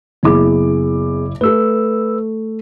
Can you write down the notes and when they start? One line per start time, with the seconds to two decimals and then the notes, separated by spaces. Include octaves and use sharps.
0.23 F#1 B3 E4 G#4 D6
1.41 A3 A4 B4 E6